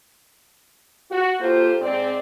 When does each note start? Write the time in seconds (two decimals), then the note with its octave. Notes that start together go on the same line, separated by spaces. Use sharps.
1.11 F#4
1.41 A#3 F4 G4 A4 C5
1.81 G#2 C4 D5